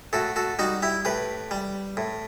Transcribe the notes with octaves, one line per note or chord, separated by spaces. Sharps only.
A2 F#4 A4
F#4 A4
G3 D#4 F#4
E4 G4
A2 G4 B4
G3
A2